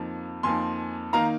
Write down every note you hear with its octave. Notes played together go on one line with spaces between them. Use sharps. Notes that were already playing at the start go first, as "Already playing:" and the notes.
Already playing: F2 F3 A#3 D#4
F2 F3 A#3 D#4 G#5 C6
D#3 A#3 D#4 F5 A#5